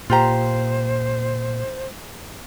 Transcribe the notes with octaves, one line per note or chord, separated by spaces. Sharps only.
A#2 F4 G4 C5 A#5